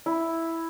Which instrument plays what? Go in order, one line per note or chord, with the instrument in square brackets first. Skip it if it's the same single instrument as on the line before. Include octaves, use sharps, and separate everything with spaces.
[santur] E4